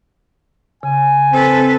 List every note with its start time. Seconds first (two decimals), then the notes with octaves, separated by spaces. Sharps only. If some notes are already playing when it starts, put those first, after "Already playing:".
0.83 C#3 G#5
1.33 C4 A4 B4